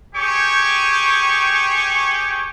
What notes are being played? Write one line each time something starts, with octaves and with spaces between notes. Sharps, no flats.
G4 G#4 C#5 G5 C#6